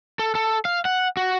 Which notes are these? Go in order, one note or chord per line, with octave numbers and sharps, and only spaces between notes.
A4
A4
F5
F#5
F#4